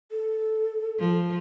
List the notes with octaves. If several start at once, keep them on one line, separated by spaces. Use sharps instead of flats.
A4
F3